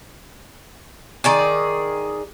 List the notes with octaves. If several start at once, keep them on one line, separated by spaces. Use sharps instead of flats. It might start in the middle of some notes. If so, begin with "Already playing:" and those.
D#3 G#4 D5